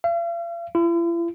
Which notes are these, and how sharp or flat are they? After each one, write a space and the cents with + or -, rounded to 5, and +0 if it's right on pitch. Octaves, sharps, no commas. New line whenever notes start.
F5 -45
E4 +45